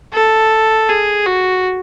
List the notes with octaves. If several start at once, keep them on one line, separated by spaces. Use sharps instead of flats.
A4
G#4
F#4